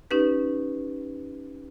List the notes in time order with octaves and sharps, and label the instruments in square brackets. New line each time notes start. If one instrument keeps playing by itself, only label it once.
[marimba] C#4 D#4 G4 B4